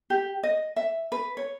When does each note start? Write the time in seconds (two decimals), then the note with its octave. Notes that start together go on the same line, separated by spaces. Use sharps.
0.10 G4
0.43 D#5
0.76 E5
1.12 B4
1.37 C#5